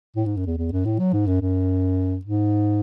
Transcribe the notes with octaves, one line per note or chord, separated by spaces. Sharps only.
A2
G#2
F#2
E2
E2
F#2
A2
F#3
G#2
F#2
F#2
G#2